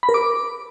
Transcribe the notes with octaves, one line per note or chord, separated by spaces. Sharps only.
B5
A#4
D6